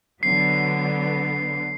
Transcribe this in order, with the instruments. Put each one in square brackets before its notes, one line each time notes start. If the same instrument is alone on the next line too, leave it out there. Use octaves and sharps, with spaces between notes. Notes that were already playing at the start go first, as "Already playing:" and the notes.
[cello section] D3 F#3 B3 [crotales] C7